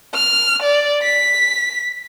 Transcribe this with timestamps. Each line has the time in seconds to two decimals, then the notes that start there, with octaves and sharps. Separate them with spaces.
0.14 F6
0.62 D5
1.02 B6